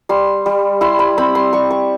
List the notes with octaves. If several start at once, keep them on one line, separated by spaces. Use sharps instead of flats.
G3 C6
G3
E4 C6
B5
C4 B5
C6
G3 C#6
C#6